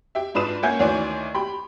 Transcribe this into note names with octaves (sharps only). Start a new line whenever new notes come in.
G4 E5
G#2 D4 F4 B4 D#6 E7
A#3 C#4 E5 F#5 G#5 G6
D2 D#3 E3 C#5 D5 G#5
G4 B5